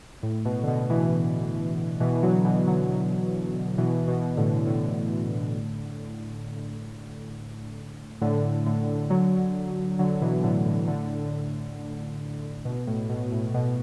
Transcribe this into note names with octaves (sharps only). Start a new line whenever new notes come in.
A2
B2
D3
B2
B2 E3
B2 E3
D3 F#3
B2 E3
D3 F#3
B2 E3
B2
A2 D3
A2 D3
A2 D3
A2 D3
D3 F#3
D3 F#3
B2 E3
A2 D3
A2
A2 D3
B2
A2
B2
A2
B2